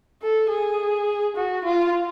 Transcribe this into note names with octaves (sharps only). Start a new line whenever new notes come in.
A4
G#4
F#4
F4